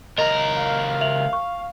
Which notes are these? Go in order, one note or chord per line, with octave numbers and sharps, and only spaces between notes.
C#2 A#4 D#5
F5
E5 F7 F#7
C#6